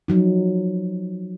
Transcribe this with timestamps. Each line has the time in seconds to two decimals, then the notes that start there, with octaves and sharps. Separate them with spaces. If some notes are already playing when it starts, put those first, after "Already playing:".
0.08 F3 F#3 D#4